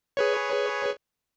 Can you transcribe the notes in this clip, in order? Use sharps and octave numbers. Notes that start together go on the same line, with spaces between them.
G#4 B4 C#5